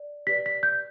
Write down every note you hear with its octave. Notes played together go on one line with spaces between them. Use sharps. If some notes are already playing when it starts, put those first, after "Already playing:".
Already playing: D5
G4 B4 D5 B6
B6
G6